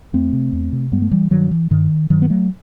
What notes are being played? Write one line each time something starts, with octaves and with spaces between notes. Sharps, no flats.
E2 A3 C4
C3
E2
C3
G2 G3 B3
A3
E3 G3
G2 D#3 F#3
E3
G2 D#3
G2 D#3 F#3
B3
F#3 A3